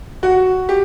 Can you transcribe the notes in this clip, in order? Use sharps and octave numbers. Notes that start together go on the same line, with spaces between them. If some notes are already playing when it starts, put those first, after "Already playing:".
F#4
G4